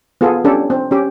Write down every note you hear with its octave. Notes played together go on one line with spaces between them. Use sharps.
B3 F4 G#4 A4
C#4 D4 G4 A4
C4
C#4 G4